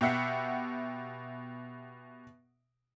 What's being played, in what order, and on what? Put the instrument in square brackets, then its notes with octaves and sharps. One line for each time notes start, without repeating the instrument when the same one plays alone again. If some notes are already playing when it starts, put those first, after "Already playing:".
[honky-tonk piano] B2 G4 E5 F#5 B6 C7